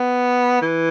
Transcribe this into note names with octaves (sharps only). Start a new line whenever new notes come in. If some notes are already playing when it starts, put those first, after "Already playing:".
Already playing: B3
E3